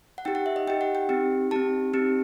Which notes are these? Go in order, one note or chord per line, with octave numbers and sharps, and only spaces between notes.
F#5
D#4 G4 G5
F#5
E5
D#5
D#4 G4 G5
F#5
G5
C4 D#4 G4
C4 D#4 G4 A5
C4 D#4 G4